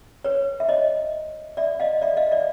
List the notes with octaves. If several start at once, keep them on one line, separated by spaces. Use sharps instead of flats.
B4 C#5
E5
C#5 D#5
D5 E5
D#5 F5
D5 E5
D#5 F5
D5 E5